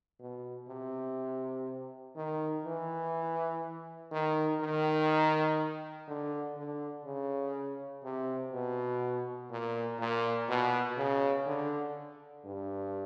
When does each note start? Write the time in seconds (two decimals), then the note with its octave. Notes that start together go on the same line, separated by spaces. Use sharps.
0.20 B2
0.68 C3
2.15 D#3
2.65 E3
4.12 D#3
4.60 D#3
6.08 D3
6.56 D3
7.05 C#3
8.04 C3
8.52 B2
9.50 A#2
9.99 A#2
10.48 B2
10.97 C#3
11.46 D3
12.44 G2